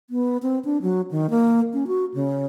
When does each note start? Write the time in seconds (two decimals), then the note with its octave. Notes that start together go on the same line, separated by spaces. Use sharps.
0.10 B3
0.43 C4
0.65 D4
0.82 F#3
1.11 D#3
1.30 A#3
1.73 C#4
1.87 F#4
2.14 C#3